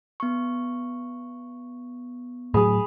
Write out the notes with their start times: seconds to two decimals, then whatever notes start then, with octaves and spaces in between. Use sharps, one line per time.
0.20 B3 C#6
2.54 A2 F#3 G#4 B5 D#6